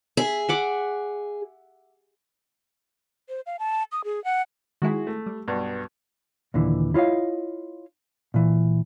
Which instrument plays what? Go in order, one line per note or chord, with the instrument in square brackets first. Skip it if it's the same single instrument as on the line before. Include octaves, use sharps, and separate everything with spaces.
[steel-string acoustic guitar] G#4 [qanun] E5
[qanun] E5 F#5 D6
[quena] C5
F5
A5
D#6
G#4
F#5
[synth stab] D#3 G#3 E4 [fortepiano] F#4 G#4
[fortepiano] A3
[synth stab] G3
[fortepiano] B1 G2
[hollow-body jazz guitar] D#2 A#2 D3 E3
E4 F4 C#5 D#5 F5
A#2 E3